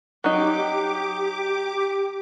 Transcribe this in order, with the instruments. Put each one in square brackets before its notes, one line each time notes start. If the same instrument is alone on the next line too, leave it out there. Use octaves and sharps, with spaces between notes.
[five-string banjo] F#3 D#4 [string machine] G4 D6